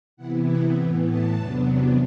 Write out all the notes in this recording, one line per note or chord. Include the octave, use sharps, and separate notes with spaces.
C3 E3 B3 E4 F#5
F#5
A2 E3 B3 G5
A5
E2 C3 F#3 B3 D4